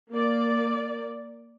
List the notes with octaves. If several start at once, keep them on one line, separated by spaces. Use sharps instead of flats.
A#3 D5